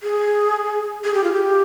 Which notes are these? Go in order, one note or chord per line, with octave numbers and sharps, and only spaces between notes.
G#4
G#4
G4
F4
G4